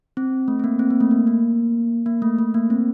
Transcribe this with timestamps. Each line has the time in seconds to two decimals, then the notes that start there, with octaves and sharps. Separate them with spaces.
0.17 C4
0.48 A3
0.60 C4
0.64 A#3
0.79 C4
0.90 A#3
1.01 A3
1.11 A#3
1.27 A#3
2.06 A#3
2.22 A3
2.38 A3
2.54 A#3
2.70 C4